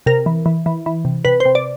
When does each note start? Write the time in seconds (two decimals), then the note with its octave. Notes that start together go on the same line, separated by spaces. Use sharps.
0.06 C3 A#4
0.26 E3
0.46 E3
0.66 E3
0.86 E3
1.05 C3
1.25 C3 B4
1.40 C5
1.45 C3
1.55 D5